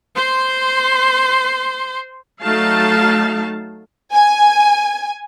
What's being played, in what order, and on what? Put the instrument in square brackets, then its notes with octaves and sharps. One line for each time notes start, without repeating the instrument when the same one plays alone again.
[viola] C5 C6
[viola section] F#3 A3 D#4 F5 A5
[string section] G#5